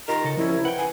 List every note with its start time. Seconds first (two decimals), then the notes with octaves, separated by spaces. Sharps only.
0.08 D#3 F4 G4 A#4 A#5
0.24 C#3 A4
0.37 C2 F3 C4 C#4 E4
0.65 B4 F#5 G5
0.78 G#5